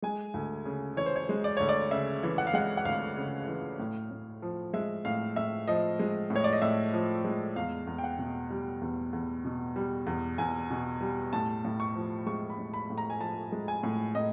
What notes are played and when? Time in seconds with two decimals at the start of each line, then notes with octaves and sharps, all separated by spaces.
0.02 G#3 G#5
0.34 D2
0.65 C#3
0.97 E3 C#5
1.06 C5
1.16 C#5
1.29 G#3
1.44 D5
1.57 D2 C#5
1.69 D5
1.91 C#3 E5
2.23 E3
2.38 F#5
2.47 F5
2.54 G#3 F#5
2.77 F#5
2.85 D2 F5
3.17 C#3
3.48 E3
3.80 A2
4.11 A2
4.42 F3
4.73 G#3 E5
5.05 A2 F5
5.36 A2 E5
5.68 F3 D#5
5.99 G#3
6.30 A2
6.36 C#5
6.44 D5
6.53 D#5
6.62 A2 E5
6.93 F3
7.24 G#3
7.56 E2 F5
7.87 E2
7.98 G5
8.04 F#5
8.19 B2
8.51 G3
8.82 E2
9.13 E2
9.45 B2
9.76 G3
10.06 E2
10.38 E2 G#5
10.70 B2
11.01 G3
11.33 A2 A5
11.65 A2
11.80 C#6
11.95 F3
12.26 G#3 C#6
12.50 B5
12.58 A2
12.74 B5
12.90 A2
12.98 A#5
13.10 G#5
13.20 F3 A5
13.52 G#3
13.68 G#5
13.83 A2
14.15 A2 D#5